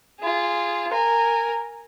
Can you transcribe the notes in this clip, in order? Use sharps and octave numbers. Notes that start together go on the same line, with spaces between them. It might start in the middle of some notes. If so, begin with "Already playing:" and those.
F4 G#4
A#4 G#5